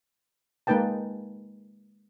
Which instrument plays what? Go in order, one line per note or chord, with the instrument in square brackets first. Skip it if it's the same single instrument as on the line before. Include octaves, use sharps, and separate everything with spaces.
[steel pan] G#3 A#3 D#4 B4 G5 A5